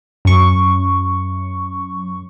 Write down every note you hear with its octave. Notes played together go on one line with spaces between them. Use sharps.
F#2 C#6